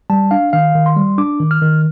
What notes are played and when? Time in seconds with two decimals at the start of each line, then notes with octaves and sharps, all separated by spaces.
0.10 G3 A5
0.31 D4 F5
0.53 D#3 F5
0.75 D#3
0.86 C6
0.96 G3
1.18 D4 D6
1.40 D#3
1.51 F6
1.62 D#3